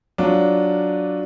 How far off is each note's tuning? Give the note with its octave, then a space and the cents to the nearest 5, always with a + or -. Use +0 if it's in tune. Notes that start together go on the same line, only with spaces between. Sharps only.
F#3 +0 D4 -5 F4 +0